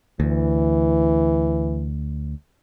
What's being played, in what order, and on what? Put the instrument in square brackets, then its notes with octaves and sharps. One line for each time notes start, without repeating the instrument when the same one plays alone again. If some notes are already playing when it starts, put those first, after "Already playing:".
[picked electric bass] D2 [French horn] E3